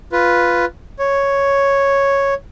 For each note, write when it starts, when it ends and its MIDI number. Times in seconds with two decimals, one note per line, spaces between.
0.12 0.65 65
0.12 0.65 71
0.99 2.34 73